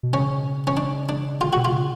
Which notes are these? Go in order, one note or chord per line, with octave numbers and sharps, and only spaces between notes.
B2
C#3 C#4
C#4
D4
D4
D3 F4
B2 F#4
F4
C#3